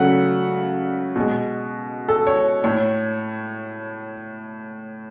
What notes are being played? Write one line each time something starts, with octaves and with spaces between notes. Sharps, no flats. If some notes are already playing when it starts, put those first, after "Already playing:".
Already playing: C#3 F#3 A3 F#5
B2 G#3
A4
C#5
A2 C#5